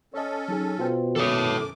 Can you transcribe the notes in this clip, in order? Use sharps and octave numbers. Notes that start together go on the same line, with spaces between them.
C#4 A4 C#5 D#5
F#3 D#4 G#4
B2 F4 C5 G5
F#2 D#3 A4 B4 C#5 D6 D#6